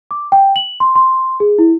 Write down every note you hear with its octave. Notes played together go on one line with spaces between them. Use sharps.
D6
G5
F#7
C6
C6
G#4
E4